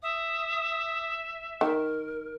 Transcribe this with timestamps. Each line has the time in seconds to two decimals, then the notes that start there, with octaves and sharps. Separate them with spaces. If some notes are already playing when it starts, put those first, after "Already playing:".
0.03 E5 D#6
1.61 D#3 A#4